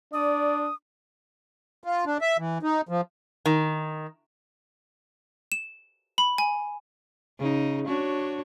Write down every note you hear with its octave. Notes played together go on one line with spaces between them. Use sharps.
D4 D5 D#6
F4
D4
E5
E3
D#4
F3
D#3
E7
B5
G#5
C#3 D#4
D4 F#4 C#5